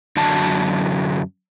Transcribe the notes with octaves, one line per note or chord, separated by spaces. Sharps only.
F#2 D3 F#3 A5